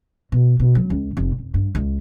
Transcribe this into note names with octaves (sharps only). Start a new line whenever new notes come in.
B2
B2
F#3
C#2
F1
F1
G2
C#2